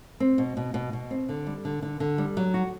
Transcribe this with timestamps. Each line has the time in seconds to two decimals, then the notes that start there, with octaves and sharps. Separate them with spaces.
0.20 C4
0.38 B2
0.57 B2
0.74 B2
0.93 B2
1.11 C4
1.29 D3
1.47 G3
1.65 D3
1.82 D3
2.00 D3
2.18 G3
2.37 F#3
2.54 F#4